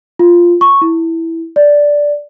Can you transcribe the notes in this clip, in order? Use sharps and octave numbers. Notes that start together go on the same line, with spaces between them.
F4
C#6
E4
D5